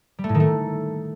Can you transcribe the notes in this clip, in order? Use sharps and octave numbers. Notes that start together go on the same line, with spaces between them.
G3
A3
A2
D#3
A3